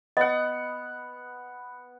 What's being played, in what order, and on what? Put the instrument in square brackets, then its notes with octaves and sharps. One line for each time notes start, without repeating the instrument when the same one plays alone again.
[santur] B3 F#5 [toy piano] D#5